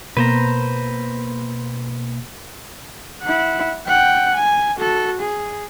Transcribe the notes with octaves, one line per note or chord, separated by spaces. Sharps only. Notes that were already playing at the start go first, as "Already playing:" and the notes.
B2 A#3 B4 C5 A#5
E4 F#5
F#5 G5
G#5
F#4 A4
G#4